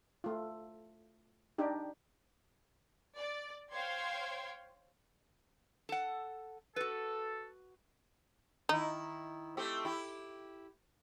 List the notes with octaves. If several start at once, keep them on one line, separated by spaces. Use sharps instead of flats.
A3 F4
D4 D#4 G4
D5
C5 C#5 F5 G5 C6 G#6
A4 F#5
F#4 A4 B4
D#3 D#4 E4
A3 C4 G4
E4 G4